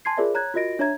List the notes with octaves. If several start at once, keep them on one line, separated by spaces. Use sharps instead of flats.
G#5 A5 C6 G#6 C7
F4 G#4 A#4 C5 D5 E5
C#5 A#5 F#6 G#6
F4 F#4 A#4 D#5 A#6 D7
D4 C#5 E5 A#5 G#6